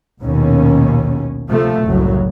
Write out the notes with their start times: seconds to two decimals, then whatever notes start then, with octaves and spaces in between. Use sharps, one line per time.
0.21 A#1 D#2 B2 C#4
1.49 D2 C3 F3 A3
1.85 F#1 C2 A2 F#3